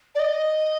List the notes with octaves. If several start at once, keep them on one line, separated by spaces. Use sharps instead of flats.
D5
D#5